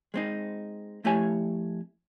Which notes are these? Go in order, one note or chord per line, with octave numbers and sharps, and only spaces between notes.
G#3 C4 D#4
F2 A3 E4 G4 C#5 G#5